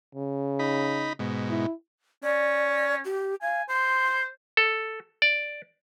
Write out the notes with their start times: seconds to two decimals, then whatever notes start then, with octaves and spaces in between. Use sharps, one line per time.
0.15 C#3
0.59 D#4 B5
1.19 G#2 B2
1.49 E4
2.24 C#4 D5
3.05 G4
3.42 F5 G#5
3.69 C5 C6
4.57 A4
5.22 D5